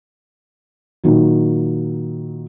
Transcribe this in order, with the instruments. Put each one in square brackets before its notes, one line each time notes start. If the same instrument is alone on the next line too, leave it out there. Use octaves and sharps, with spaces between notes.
[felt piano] A#2 D#3 F#3